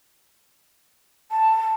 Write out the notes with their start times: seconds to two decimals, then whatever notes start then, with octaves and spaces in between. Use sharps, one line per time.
1.31 A5